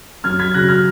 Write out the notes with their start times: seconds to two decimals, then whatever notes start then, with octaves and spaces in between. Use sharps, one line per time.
0.24 F#2 F6 G#6
0.39 G#6 B6
0.54 C#3 F#3 F#6 A#6
0.68 F6 G#6